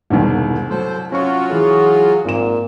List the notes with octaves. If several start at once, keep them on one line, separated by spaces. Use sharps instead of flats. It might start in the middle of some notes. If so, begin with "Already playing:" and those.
E1 C2 G2 D3 D#3
F#3 A4 C5
F#3 C#4 F4 F#4 C#6
E3 G#4
G#1 A#2 E7